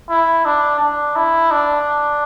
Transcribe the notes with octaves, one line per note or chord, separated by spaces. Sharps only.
E4
D4
D4
E4
D4